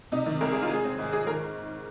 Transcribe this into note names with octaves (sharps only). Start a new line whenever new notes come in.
C3 D#4
D#3
C2 A#4
G#3 G#4
F4
G#3 G#4
C4
G#2
G#2 G#4
D#3 A#4